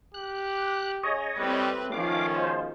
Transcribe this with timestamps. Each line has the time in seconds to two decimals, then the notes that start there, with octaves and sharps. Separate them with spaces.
0.14 G4 F#6
1.03 C#3 G#4 C#5 D#5
1.38 A2 G3 C4 B4
1.92 D#3 F3 C#4 F5 D6
2.35 B2 G#3 F4 C5